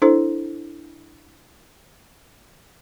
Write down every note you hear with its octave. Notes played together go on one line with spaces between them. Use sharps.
D4 E4 A4 C5